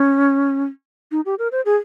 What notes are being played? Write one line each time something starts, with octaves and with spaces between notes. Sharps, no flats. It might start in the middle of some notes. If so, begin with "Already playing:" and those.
Already playing: C#4
D#4
G4
A#4
C5
G#4